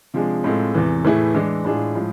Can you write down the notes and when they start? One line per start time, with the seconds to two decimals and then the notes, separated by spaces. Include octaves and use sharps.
0.14 C3 F3 G#3 D4 G#4
0.44 A2 G#3 C4 F4 A4
0.74 E2 C3 E3
1.04 A2 E3 A3 E4 G#4
1.34 E3 G#3 D4
1.65 A2 G#3 D4 F4 G#4
1.95 A2 F3 G#3